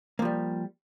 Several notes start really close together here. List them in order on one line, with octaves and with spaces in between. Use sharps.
A#3 F3 G3